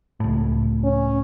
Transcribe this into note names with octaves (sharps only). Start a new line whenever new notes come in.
C#2 A2
C#4